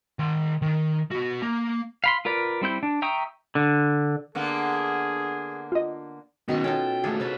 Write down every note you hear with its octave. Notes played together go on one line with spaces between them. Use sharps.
D#3 C6
D#3
B3 F#4
A#3
F5 B5 C6
F4 A#4 B4 D5
G3 C4 E4 G6
D4
E5 G5 A#5 C#6 D#6
D3
D3 A#3 B3 G#4
F4 D#5
B2 D#3 B3 C#4 C6 C#6
C#4 D#4 F4 A4 G5 A5
D#2 A3 G#4 A4
C3 B4 C#5 A5 B5